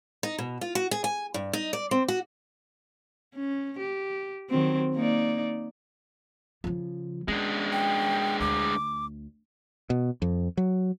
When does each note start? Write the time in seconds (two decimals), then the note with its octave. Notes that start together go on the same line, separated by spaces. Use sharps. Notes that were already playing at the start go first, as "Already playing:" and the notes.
0.23 D#4
0.38 B2
0.61 F4
0.75 F#4
0.91 G#4
1.04 G#5
1.34 G2
1.53 D#4
1.73 D5
1.91 C4
2.08 F#4
3.35 C#4
3.79 G4
4.49 D#3 F#3 C4
4.95 A#3 D#4 D5
6.64 C#3 F3
7.28 G#3 C#4 D4
7.73 G5
8.40 D2 D6
9.90 B2
10.22 F2
10.57 F#3